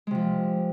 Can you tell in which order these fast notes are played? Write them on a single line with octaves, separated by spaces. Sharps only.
G#3 C3 F3